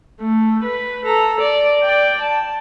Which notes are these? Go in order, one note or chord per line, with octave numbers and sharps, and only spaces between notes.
A3
B4
A4 A#5
D5
D5 G5
A5